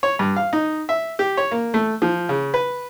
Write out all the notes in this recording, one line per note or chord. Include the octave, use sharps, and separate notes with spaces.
C#5
G2
F5
D#4
E5
G4
C#5
A#3
A3
F3
C#3
B4